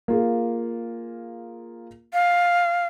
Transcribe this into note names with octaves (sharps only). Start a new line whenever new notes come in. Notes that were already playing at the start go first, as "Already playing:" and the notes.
A#3 F4 G#4
F5